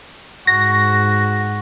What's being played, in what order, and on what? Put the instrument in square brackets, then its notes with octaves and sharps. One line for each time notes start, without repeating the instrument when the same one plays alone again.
[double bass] G#2 [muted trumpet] F#4 [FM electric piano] A#6